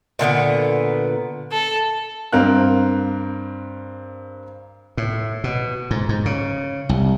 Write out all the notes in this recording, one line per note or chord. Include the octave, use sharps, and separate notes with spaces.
A#2 D3 A3 B3
A4
G2 C4 A#4 F5 F#6
A2
B2
G#2
G#2
C#3
C2